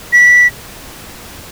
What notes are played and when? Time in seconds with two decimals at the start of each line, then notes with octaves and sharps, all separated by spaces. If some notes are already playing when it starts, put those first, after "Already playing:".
0.13 B6